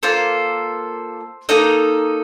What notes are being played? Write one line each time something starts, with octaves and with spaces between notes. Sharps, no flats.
A#3 F4 A4 C5
A#3 D#4 A4 D#5